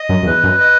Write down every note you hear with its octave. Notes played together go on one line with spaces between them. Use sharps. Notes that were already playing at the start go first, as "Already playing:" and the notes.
Already playing: D#5
F#2
F#2
E2 B4
F#2
D#5